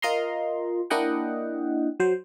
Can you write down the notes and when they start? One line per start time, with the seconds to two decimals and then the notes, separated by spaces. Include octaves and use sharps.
0.02 F4 A#4 D#5 A#5 C6
0.90 A#3 D4 E4 D#5 F#5 G5
2.00 F#3 C5